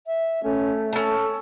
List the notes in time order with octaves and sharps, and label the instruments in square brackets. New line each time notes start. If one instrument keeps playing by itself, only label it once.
[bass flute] E5
[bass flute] A3 [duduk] C#4
[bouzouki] C#4 A5 [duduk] A4